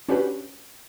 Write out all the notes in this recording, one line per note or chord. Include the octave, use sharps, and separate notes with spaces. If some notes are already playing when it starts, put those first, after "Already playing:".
C#4 D4 F#4 G4 B4